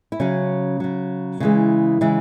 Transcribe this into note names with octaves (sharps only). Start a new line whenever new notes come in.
E4
C#3 F#3 C#4
C#3 F#3
C#3 E3 G#3
C#3 E3 G#3